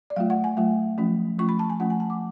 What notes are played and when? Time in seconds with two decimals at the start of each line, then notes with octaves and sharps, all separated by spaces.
0.10 D5
0.16 F#3 A3 F4 F5
0.30 F#5
0.44 G#5
0.57 F#3 A3 F4
0.98 F3 A3 C#4 F4
1.39 F3 A3 C#4 F4 C#6
1.49 B5
1.59 A5
1.70 G#5
1.80 F3 A3 C#4 F4 F#5
1.90 G#5
2.00 A5
2.10 D6